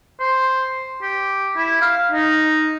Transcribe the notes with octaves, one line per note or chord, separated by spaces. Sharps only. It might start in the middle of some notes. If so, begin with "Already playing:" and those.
C5
G4
E4
F5
D#4